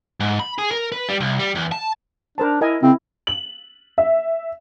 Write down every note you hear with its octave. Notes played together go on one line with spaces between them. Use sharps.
G#2
B5
G#4
A#4
B4
G3
C2
G3
E2
A5
D4 A#4 C5 A5
E4 A#4 D#5 G#5
C#3 C4 E4
F#7
E5